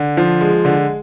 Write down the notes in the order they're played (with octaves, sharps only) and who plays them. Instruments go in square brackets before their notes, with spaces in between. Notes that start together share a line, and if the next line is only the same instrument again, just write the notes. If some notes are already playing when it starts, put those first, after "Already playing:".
Already playing: [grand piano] D3
F3
G#3
D3